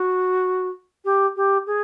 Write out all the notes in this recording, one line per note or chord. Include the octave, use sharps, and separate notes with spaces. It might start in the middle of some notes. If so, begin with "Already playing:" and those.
Already playing: F#4
G4
G4
G#4